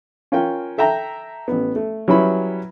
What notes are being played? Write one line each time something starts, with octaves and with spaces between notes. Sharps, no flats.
C#4 F4 A#4 G5
A4 E5 G5 A#5
A1 B3
A3
F#3 G3 C#4 E4 B4 B5